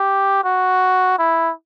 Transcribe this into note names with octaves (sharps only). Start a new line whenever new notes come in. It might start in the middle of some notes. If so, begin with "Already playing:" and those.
Already playing: G4
F#4
E4